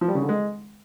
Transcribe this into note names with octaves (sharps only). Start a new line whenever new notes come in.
F3
G3
C#3
D3
G#3